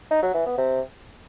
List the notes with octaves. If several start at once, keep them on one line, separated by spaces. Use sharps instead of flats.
D#4
F#3
E3
B3
C3